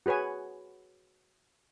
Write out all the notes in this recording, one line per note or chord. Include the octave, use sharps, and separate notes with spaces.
F#4 G#4 B4 C#5 G#5